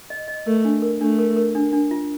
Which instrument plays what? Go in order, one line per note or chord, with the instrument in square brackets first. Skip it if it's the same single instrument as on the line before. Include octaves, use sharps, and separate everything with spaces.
[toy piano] D#5
D#5
[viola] A3 [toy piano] A#4
[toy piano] D4
A#4
[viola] A3 [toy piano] D4
[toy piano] A#4
A#4
D4
D4
F4